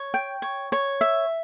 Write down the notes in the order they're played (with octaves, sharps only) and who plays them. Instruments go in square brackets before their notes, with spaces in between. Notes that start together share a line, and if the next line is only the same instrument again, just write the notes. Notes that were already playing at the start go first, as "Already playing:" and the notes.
Already playing: [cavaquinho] C#5
G5
C#5
C#5
E5